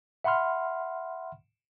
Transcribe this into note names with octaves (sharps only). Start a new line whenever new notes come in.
E5 F#5 B5 C6 F6